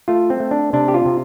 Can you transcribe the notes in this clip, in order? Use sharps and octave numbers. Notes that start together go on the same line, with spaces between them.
A3 F4
C4
A3
D4
C3 D4
G4
F4
C3